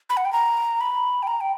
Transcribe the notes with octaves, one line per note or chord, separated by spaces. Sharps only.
B5
F#5
G5
A#5
B5
G5
A#5
G5